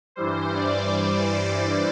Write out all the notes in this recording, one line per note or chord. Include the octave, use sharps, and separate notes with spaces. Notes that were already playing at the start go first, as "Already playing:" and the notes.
G2 E3 G3 C5
D5
C5
C5